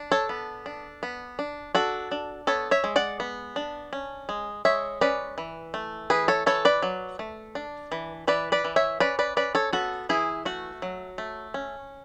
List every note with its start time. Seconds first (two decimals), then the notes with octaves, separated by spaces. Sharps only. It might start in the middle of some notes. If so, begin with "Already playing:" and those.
Already playing: D4
0.12 A4 C#5
0.29 B3
0.66 D4
1.03 B3
1.39 D4
1.75 D4 F#4 A4
2.12 D4
2.47 B3 A4 C#5
2.71 C#5 E5
2.84 G#3
2.96 D5 F#5
3.20 B3
3.56 D4
3.93 C#4
4.29 G#3
4.65 G#3 C#5 E5
5.01 C#4 B4 D5
5.38 E3
5.74 A3
6.10 E3 G#4 B4
6.28 A4 C#5
6.46 E3 A4 C#5
6.65 B4 D5
6.82 F#3
7.19 A3
7.55 D4
7.92 E3
8.28 E3 B4 D5
8.52 B4 D5
8.64 E3
8.76 C#5 E5
9.00 C#4 B4 D5
9.19 B4 D5
9.37 C#4 B4 D5
9.55 A4 C#5
9.73 B3 F#4 A4
10.09 E3 E4 G#4
10.45 A3 F#4
10.82 F#3
11.18 A3
11.54 C#4